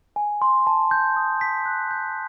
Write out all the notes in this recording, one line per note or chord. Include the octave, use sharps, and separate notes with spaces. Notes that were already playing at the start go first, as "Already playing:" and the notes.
G#5
C6
A5
G6
D#6
B6
F#6
G6